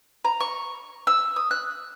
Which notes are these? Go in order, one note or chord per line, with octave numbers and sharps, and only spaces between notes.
A#5
C#6
E6
D#6
F#6